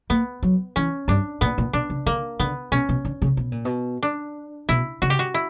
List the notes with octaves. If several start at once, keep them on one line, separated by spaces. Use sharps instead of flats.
A#3 B3
F#3
E3 C#4
G2 D4
A#2 B3
A#2
B2 D4
C#3
D3 A#3
D3 B3
B2 C#4
B2
D3
C#3
B2
A#2
B2
D4
B2 E4
C#3 F#4
G4
F#4
E4